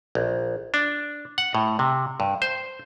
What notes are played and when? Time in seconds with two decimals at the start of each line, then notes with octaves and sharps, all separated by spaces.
0.15 A#1
0.74 D4
1.38 F#5
1.55 A2
1.79 C3
2.20 G2
2.42 C5